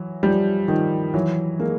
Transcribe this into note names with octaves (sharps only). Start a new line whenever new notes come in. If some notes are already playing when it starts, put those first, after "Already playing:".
Already playing: E3 F#3
F3 G3
D#3 F3
E3 F#3
G#3 A#3